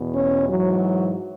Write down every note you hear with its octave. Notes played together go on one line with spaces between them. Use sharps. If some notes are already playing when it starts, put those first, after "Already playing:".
Already playing: E2 B2
C#4
G#2 E3 F#3